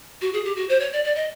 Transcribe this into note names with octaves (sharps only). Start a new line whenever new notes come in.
F#4
G#4
G4
F#4
C5
C#5
D5
D5
D#5